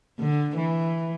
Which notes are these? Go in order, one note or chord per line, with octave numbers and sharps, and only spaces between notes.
D3
E3